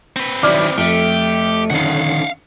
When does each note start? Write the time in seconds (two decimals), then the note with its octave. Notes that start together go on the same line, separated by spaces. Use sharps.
0.16 C4 B4
0.43 D#3 F#3 E4 D5 D6 F6
0.78 F2 A3 G4
1.70 D3 D#3 C#4 F5 F#5